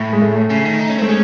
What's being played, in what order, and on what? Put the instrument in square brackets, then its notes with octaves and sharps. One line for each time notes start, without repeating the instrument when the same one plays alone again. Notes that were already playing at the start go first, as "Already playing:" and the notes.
Already playing: [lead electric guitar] A2
[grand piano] G#3
A3
[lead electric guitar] C#3
D#3
D#4
C#4
[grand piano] A3 [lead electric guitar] C4
[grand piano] G#3 [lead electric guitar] C#4